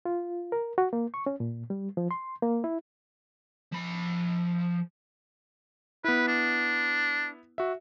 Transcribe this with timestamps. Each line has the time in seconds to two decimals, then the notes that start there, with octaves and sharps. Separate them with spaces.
0.05 F4
0.52 A#4
0.78 F#4
0.93 A#3
1.14 C#6
1.26 C#4
1.40 A#2
1.70 G3
1.97 F3
2.11 C6
2.42 A#3
2.64 E4
3.72 F3 B5
6.04 B3 E4 B4
6.28 D4
7.58 F#4 E5